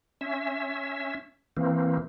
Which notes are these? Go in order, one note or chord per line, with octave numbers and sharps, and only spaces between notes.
C#4 E5
E3 A#3 C4